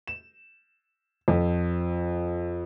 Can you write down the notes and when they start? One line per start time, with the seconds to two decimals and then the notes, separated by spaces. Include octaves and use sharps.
0.07 E7
1.28 F2